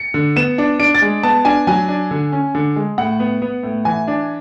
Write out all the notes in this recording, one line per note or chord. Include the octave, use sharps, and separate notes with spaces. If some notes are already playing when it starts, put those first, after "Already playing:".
Already playing: C#7
D3
B3 E7
D4
D4 D7
A6
G#3
B3 A5
D4 G#5
F#3 G#5
D4
D3
C#4
D3
G#3
A2 F#5
B3
B3
A2
E3 G#5
D4